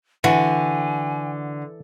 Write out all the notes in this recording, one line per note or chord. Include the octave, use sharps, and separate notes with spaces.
D3 E3 F#4 G#5